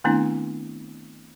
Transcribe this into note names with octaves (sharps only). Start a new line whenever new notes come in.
D#3 A3 B3 C4 D4 E4